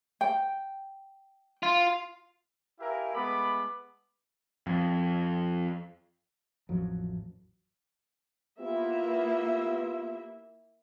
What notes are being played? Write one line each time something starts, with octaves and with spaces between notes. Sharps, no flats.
G5
F4
E4 G4 A#4 E5 F5 G#5
G#3 A3 B3 B5 D6
F2
A1 F2 F3 F#3
A#3 B3 E4 F4 G4 E5